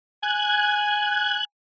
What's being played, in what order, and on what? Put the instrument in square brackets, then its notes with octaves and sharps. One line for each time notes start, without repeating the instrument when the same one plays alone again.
[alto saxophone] G#5 [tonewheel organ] F#6 G#6